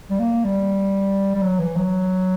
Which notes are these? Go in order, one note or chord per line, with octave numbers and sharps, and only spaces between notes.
G3
A#3
G3
G3
F#3
E3
F#3